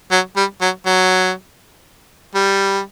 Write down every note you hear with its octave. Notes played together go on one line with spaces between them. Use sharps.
F#3
G3
F#3
F#3
G3